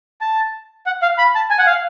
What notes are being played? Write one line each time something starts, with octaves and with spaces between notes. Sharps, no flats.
A5
F#5
F5
B5
A5
G#5
F#5
F5